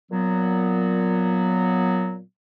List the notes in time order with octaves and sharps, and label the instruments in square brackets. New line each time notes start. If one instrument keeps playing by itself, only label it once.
[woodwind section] A#2 F#3 B3